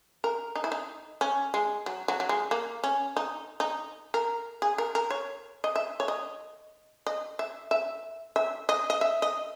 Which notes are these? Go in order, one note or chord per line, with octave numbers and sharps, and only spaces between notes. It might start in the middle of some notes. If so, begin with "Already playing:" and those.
A#4
D#4
E4
D#4
C#4
G#3
F#3
F#3
F#3
G#3
A#3
C#4
D#4
D#4
A#4
G#4
A#4
A#4
C#5
D#5
E5
C#5
D#5
D#5
E5
E5
E5
D#5
D#5
E5
D#5